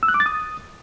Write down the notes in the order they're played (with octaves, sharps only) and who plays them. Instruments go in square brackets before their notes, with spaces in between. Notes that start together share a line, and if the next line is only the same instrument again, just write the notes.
[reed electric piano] E6
F#6
D6
A6
D#6